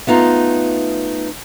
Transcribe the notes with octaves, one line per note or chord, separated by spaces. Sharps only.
A3 B3 D#4 F4